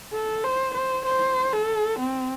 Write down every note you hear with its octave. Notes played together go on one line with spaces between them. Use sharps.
A4
C5
C5
C5
A4
C4